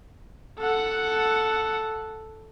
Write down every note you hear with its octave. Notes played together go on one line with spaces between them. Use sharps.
A4 F#5